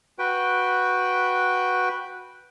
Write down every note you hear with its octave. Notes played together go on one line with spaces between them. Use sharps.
F#4 B4 G5